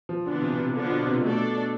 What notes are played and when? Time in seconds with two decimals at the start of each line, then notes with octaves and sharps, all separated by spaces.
0.09 F3
0.26 D3 E3 B3 D4 F4
0.41 C3
0.58 C3
0.73 D3 F3 B3 D4 F4
0.90 B2
1.06 C3
1.21 B2 A3 D4 A4 D5